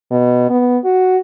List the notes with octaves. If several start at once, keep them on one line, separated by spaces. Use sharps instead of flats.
B2
B3
F#4